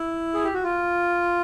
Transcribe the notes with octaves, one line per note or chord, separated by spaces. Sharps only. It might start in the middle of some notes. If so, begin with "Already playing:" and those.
Already playing: E4
G#4
G4
F#4
F4